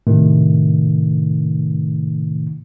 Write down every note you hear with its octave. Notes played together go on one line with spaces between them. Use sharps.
A2 C3 D#3 A3